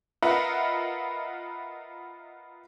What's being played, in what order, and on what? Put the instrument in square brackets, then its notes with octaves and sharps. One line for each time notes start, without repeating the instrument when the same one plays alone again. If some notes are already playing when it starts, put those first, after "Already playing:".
[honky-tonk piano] F4 A#4 B4 D#5 E5 F#5